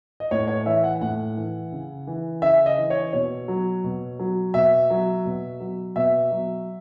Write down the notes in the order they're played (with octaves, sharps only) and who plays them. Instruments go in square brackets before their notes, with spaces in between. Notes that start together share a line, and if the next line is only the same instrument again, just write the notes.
[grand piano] D#5
A2 C#5
C#5
E3 E5
F#5
A2 F#5
E3
C#3
E3
C#3 E5
D#5
E3
C#5
B2 C#5
F#3
B2
F#3
B2 E5
F#3
B2
F#3
B2 E5
F#3